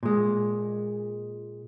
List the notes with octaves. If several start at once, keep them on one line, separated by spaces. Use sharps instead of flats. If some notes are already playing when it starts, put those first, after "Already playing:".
A#2 G#3